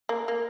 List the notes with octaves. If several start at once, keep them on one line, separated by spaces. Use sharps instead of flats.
A#3
A#3